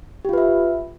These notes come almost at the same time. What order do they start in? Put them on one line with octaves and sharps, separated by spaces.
G4 F4 B4 E5